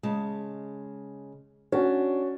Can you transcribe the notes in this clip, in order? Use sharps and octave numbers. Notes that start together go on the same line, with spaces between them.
C#3 G#3 A5
C#4 D4 F#4